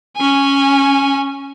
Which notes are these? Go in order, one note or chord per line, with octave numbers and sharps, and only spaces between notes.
C#4 G#5